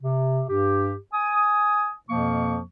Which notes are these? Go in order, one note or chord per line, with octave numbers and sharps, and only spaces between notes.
C3
G2 G4
G#5 D#6
F2 B2 F3 A#3 C#6